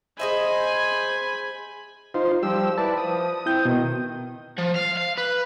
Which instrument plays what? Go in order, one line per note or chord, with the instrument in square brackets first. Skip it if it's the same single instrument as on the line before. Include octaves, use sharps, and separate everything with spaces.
[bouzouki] G#4 D#5 E5 [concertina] C5 [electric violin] G#5 B5
[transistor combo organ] D#4 F4 C5
[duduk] F3 [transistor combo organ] G3 G4 E6
[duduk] E4 [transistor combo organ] B4 D5 [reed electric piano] A5
[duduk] F3 [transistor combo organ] D#6
[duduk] C4 [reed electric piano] E4 G6
[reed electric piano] B2 [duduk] D#3
[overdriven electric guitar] F3
F5
F5
B4